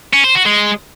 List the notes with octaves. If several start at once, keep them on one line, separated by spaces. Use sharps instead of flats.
C#4
C5
F#4
G#3